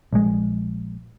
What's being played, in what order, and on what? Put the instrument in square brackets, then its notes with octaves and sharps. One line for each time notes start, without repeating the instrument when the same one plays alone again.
[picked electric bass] A#1 G#3